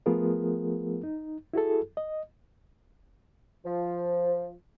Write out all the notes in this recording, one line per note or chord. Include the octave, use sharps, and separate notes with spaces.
F3 A3 B3 F4 G#4 A#4
D#4
E4 F#4 G#4 A4
D#5
F3